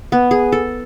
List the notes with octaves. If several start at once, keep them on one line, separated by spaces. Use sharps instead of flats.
B3
G#4
A4